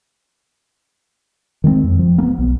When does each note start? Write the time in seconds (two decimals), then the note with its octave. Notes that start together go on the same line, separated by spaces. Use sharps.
1.64 D#3 G#3 A#3 C4
1.84 F2
1.99 F3
2.18 A#3 B3
2.39 B1